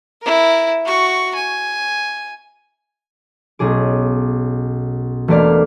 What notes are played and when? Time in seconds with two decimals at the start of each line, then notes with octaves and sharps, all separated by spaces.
0.22 E4 A#4
0.85 F#4 C#6
1.35 G#5
3.59 B1 C#4 G#4 D6
5.28 E1 A3 A#3 D5 F5